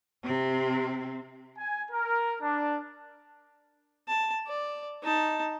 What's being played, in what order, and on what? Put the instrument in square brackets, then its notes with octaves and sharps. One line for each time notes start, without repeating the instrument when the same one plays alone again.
[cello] C3 C4
[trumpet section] G#5
A#4
D4
[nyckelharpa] A5
D5
D#4 A5